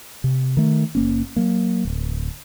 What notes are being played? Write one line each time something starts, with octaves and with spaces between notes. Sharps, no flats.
C3
D#3 A3
F#1 A#3 C#4
F#3 A#3
D1